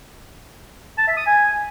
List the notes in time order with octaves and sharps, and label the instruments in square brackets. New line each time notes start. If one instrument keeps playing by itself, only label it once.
[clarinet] A5
E5
D#6
G#5